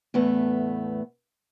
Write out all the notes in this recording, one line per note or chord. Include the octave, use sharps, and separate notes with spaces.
E2 A2 A3 B3